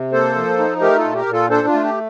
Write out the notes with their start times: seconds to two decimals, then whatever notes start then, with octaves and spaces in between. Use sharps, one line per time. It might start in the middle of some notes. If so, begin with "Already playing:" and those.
Already playing: C3
0.12 A#3 A4 C5
0.35 F3
0.59 D#4
0.81 A3 G4 A#4
0.98 F4 A4
1.04 A#2
1.15 G4 A#4
1.26 A#2
1.33 F4 A4
1.50 D4 A4 C5
1.68 F4
1.73 A3
1.84 G4